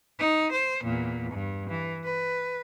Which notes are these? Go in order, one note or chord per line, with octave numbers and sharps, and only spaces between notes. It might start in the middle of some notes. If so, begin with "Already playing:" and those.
D#4
C5
E2 A#2
G2
E3
B4